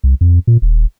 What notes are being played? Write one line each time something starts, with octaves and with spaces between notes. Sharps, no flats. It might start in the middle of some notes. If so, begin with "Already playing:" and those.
C2
F2
A#2
D#1